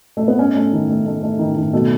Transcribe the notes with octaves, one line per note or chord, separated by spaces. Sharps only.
A3
B3
A3 C#4
A3
D#3
A3
A3
A3
D#3
D#3
B2 A3